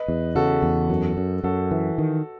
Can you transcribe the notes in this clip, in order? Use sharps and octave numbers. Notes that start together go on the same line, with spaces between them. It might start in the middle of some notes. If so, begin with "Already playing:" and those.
Already playing: B4 D#5
E2
C#3 F#4 A4
E2
F#2
F#2
F#2 F#4 A4
E3
D#3